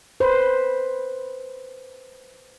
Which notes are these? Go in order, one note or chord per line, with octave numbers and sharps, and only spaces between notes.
B4 C5